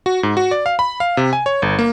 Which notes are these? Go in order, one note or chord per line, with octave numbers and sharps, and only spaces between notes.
F#4
G#2
F#4
D5
F5
B5
F5
C3
G#5
C#5
G1
A#3